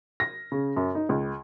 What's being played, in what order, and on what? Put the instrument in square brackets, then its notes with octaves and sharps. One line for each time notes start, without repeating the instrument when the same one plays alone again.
[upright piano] A#6
C#3
F#2
D#4
C#2